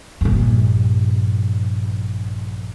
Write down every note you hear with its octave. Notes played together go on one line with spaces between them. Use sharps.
A#1 G2